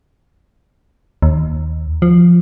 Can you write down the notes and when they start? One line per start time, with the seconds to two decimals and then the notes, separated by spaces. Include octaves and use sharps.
1.22 D#2
2.02 F3